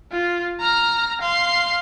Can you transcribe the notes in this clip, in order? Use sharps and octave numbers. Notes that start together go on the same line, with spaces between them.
F4
A#5 F6
F5 C6